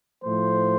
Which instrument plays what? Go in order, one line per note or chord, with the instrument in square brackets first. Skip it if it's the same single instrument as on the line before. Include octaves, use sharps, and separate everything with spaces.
[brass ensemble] A2 F3 A3 C5